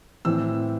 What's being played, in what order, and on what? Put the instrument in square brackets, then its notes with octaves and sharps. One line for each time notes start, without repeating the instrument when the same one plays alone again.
[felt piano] A2 E3 C4 E6